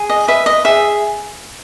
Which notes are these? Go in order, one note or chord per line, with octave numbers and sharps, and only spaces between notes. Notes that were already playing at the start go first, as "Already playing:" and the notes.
Already playing: G#4
D#5
B4 D#5 E5
D#5
G#4 E5